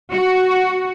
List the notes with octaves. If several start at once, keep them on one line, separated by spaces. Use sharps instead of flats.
F#4